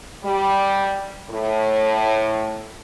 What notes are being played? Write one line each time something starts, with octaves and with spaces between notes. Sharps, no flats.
G3
A2